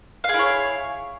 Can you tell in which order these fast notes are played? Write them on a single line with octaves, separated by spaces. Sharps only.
F5 G#4 E4 C#5